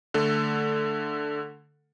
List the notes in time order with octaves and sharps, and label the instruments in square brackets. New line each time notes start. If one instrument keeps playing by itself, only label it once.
[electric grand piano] D3 A3 A4